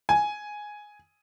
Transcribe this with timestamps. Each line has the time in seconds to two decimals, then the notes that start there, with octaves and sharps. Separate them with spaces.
0.09 G#5